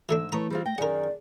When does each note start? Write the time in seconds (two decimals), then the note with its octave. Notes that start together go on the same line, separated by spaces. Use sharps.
0.09 G#2 E3 A3 D4 E6
0.32 E3 A3 B4 C#5 A#5 D#6
0.50 G3 C4 F4 G#4
0.66 A3 G5 A#6
0.78 F#2 D#3 G#4 A#4 D5 F#5